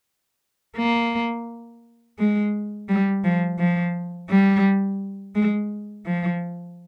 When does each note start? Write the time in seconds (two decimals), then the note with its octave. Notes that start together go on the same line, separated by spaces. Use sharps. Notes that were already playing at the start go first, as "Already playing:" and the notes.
0.77 A#3
2.18 G#3
2.89 G3
3.24 F3
3.59 F3
4.29 G3
5.35 G#3
6.06 F3